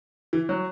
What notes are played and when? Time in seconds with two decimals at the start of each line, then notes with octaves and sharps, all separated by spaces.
0.33 E3
0.49 F#3